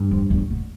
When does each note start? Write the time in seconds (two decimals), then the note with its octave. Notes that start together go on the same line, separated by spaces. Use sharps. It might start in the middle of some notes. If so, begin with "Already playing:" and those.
Already playing: G2
0.11 F2
0.30 E2
0.50 B2